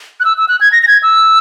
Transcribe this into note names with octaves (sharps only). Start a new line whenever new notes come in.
F#6
E6
E6
F#6
G#6
A#6
A#6
G#6
E6